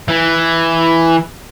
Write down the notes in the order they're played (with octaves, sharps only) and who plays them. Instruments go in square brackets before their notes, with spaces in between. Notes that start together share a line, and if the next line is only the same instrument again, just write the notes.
[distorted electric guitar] E3